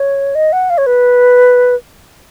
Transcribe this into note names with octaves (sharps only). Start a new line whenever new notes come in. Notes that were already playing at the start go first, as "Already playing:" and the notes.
Already playing: C#5
D#5
F#5
F5
C#5
B4